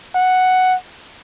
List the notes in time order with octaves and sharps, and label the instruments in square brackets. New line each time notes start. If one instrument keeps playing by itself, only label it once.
[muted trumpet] F#5